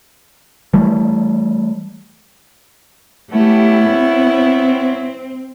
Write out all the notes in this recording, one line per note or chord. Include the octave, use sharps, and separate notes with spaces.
E3 G3 A3
A3 B3 C#4 E4 G4
C4